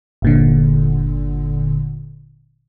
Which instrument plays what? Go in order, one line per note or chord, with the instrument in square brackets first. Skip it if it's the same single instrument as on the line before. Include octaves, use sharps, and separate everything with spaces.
[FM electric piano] G1 A#2 D3